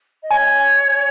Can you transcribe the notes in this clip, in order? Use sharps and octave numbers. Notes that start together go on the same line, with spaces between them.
D#5
C#5 G#5